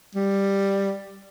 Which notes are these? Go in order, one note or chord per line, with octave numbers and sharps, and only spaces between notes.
G3